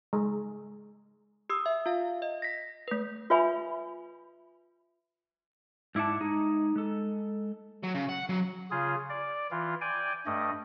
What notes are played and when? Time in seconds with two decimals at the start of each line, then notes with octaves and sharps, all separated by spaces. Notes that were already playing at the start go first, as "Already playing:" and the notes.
0.13 G#3
1.49 G4 D#6 E6
1.66 E5
1.86 F4 F5
2.22 D#5
2.42 A#6 B6
2.88 A3 B4
3.30 F4 B4 C#5 E5 G#5 B5
5.95 G#2 E4 D5 F#5 A5
6.20 G#3 D#4 G#4
6.76 G#3 A4
7.83 F#3
7.94 C#3
8.09 F#5
8.29 F#3
8.71 C#3 F4 G#4
9.09 D5
9.51 E3 F4
9.81 D5 G5 G#5
10.26 G2 A3 D#5